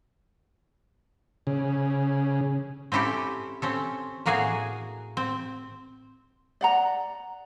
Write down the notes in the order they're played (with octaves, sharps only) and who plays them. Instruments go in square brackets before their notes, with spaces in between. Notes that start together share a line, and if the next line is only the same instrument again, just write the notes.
[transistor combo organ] C#3
[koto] C4 C#4 E4 G4 A4
C4 C#4 A4
A2 A#3 F#4 G#4 F5 G#5
C4
[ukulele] D5 F#5 A#5